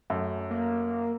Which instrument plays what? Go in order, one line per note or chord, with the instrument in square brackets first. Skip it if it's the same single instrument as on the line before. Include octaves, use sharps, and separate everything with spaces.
[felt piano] F#2 A3
[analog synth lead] A#3